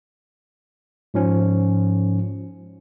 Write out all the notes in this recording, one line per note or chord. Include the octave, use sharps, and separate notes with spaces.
G#2 F3 C#4